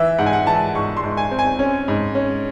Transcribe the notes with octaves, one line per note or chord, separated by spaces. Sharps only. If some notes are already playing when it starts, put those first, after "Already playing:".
Already playing: E3 E5
G#2 F#5
G#5
F#5
E3 A5
G#2 C#6
C6
G#2
G#5
C4
G#5
C#4
G#2
C#4